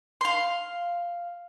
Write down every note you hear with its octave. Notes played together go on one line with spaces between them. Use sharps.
F5 C6